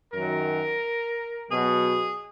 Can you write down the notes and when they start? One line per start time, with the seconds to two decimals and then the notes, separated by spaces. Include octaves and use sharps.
0.14 F#2 D#3 F#3 A#4
1.50 B2 F#3 G#4